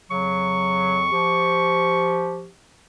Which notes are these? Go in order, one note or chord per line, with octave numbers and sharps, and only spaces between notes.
F2 C#3 F#3 C#6
F3 G4